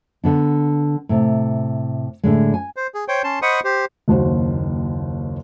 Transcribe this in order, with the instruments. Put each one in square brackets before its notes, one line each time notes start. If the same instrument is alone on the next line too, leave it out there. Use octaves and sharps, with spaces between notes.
[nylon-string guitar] D3 B3 D4
A2 C3
A2 D3 G#3
G#5
[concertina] C5
G#4
C5 C#5 G5
C#4 A5 C6
C5 D#5 F#5 B5 C#6 D#6
G4 C5
[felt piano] F#1 D#2 F#4 C5